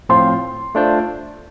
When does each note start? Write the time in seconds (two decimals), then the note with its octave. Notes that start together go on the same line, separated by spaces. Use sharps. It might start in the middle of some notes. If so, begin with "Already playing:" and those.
0.09 A2 F3 C4 F4 C5 C6
0.75 A3 D4 F4 C5